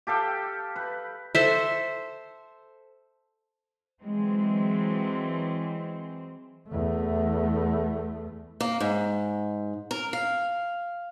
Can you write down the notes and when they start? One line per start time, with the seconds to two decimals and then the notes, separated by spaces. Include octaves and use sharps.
0.07 G4 A4 F5 G5
0.76 B4
1.35 A4 C5 E5
4.02 E3 F#3 G#3 C4
6.69 E2 A3
8.61 A#3
8.80 G#2
9.91 A#4
10.13 F5